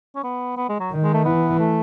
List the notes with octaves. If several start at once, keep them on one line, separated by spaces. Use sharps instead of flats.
C#4
B3
B3
G#3
F#3
D#3
G#3
A3
E3 B3
A3